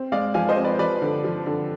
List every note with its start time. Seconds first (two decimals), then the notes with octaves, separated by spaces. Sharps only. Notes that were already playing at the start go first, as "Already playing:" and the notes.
Already playing: C4
0.12 G#3 D5 F5
0.34 F3 F5 G#5
0.49 C5 D#5
0.57 C4
0.64 B4 D5
0.79 F3 B4 D5
1.02 D3
1.24 F3
1.46 D3